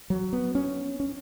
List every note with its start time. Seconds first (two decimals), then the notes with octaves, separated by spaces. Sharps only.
0.10 F#3
0.33 B3
0.55 C#4
1.00 C#4